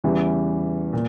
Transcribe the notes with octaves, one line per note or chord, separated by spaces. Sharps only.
E2 C#3 E3 G3
A#2